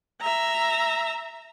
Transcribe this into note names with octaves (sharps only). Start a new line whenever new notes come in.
E5 A#5